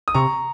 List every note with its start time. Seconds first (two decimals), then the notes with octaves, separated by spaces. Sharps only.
0.08 D#6
0.14 C3 A#5 C#6